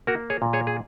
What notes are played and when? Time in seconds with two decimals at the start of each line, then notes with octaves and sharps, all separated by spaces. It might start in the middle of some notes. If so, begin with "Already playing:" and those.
0.07 A#3 F#4 A#4
0.30 G#4 C#5
0.42 A#2
0.53 G#4 C#5
0.67 G#4